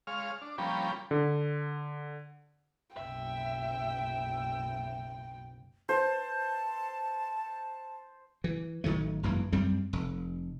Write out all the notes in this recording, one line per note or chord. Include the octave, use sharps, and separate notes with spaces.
G#3 C#5 F5 F6
D4
F3 G3 A#3 C#4 G5 B5
D3
F#1 B1 E5 G5
C5 A5
E3
A1 D#3 F#3 A3
G#1 F#2 E3 A#3
F#2 G3 C4
F1